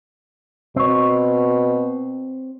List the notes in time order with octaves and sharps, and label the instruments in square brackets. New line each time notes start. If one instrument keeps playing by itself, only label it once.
[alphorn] B2 [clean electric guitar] C4 C#5